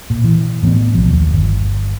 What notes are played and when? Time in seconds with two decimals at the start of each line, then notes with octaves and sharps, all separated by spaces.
0.10 A#2
0.24 E3
0.63 A2 A#3 B3
0.94 B1 F3
1.08 D#2
1.32 G1